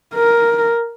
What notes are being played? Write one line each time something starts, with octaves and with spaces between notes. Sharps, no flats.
A#4